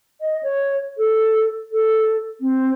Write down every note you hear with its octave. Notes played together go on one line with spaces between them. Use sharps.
D#5
C#5
A4
A4
C4